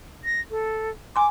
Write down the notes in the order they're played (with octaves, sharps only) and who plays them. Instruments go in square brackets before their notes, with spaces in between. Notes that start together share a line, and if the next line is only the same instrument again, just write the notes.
[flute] A#6
A4
[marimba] G#5 C6 [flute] D6